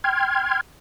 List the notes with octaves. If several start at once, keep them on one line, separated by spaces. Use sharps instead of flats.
G5 C6 F6 G#6